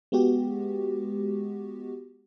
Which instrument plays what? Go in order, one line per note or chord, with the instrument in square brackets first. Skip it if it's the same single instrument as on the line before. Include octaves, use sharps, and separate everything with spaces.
[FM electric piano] G#3 B3 F#4 G4